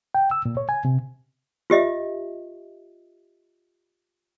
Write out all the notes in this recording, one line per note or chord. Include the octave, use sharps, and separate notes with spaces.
G5
E6
A#2
C#5
G#5
C3
F4 G4 D#5 E5